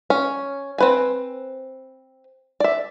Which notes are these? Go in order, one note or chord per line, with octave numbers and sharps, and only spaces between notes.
C#4
C4 B4 G#5
D5 E5